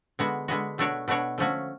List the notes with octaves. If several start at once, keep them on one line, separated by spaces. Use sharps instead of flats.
D3 G#3 B3 F#4
D3 G#3 B3 F#4
B2 A3 D4 F#4 C#5
B2 A3 D4 F#4 C#5
D3 F3 A3 C#4 F#4